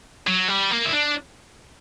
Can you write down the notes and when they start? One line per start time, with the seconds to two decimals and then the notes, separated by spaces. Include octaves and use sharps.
0.27 F#3
0.48 G3
0.71 A#3
0.85 E4
0.92 D4